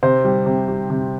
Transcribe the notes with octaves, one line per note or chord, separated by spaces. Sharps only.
C3 C5
G3
C3
G3
C3